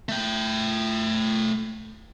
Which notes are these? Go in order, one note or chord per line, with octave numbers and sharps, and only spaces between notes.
A3 G5